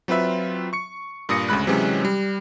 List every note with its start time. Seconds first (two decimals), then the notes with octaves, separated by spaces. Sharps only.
0.08 F#3 C4 F4 B4 E5
0.73 C#6 C#7
1.29 G2 A#2 D#6 A#6 C#7
1.49 D2 C#3 G#3 B5 F#6
1.67 C3 E3 F#3 G#3 C4 C#4
2.05 G3